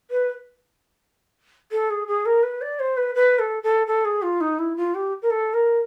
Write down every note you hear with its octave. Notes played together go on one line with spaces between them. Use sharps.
B4
A4
G#4
G#4
A#4
B4
D5
C5
B4
B4
A4
A4
A4
G#4
F4
D#4
E4
F4
G4
A#4
A4
A#4